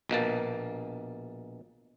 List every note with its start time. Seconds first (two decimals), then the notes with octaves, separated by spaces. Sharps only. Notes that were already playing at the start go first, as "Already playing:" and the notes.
0.09 A#1 B2 A#3 A5